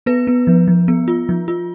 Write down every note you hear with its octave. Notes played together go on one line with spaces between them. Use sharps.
B3 B4
B3
F3
F3
B3
F4
F3
F4